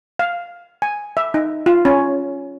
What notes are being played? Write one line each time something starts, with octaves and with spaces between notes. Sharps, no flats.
F5
G#5
E5
D#4
F4
C#4